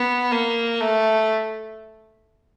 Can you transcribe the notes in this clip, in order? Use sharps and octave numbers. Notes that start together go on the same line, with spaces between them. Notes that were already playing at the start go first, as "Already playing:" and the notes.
Already playing: B3
A#3
A3